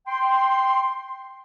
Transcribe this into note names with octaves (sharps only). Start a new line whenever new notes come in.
G5 C6